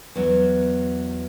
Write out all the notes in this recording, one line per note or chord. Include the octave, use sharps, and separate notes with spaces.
E2 F#3